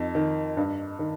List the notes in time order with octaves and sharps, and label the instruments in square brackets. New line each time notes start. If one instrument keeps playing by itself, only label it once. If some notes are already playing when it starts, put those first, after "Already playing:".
Already playing: [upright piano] F2 D#4
D#3
G2
D#3